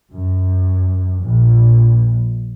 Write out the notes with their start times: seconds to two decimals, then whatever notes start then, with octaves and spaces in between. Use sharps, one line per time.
0.11 F#2
1.22 A#1